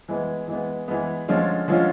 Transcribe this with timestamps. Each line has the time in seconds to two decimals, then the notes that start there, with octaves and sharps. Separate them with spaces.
0.08 E3 G#3 B3
0.48 E3 G#3 B3
0.88 E3 G#3 B3
1.28 D3 F3 G#3 C#4 F4
1.68 D3 F3 G#3 C#4 F4